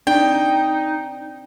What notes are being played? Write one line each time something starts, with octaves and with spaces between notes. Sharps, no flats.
C4 D4 D#4 D5 G5